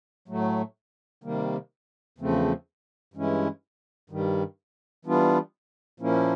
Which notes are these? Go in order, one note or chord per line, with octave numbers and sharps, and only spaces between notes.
A2 F#3 A3
C3 D#3 G3 A#3
E2 C#3 F3 A3 C4
G2 E3 G#3 C#4 E4
G2 D#3 G3
E3 G3 B3 D4 F4
A#2 F3 A#3 C#4 E4